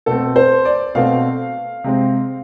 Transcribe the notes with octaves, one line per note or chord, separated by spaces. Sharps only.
B2 A3 C4 A4
C5
D5
B2 A3 C4 F5
C3 G#3 C4